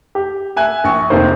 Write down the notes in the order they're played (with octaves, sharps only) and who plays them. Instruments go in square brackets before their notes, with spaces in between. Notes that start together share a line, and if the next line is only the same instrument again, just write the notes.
[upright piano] G4
E5 G#5 F#6
A#1 C#6
F1 A#1 D#3 A#3 C5